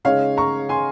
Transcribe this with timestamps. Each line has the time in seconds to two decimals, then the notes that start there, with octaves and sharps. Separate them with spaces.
0.05 C#3 G#3 D#4 C#5 F5
0.37 A#5 C#6
0.69 G#5 C6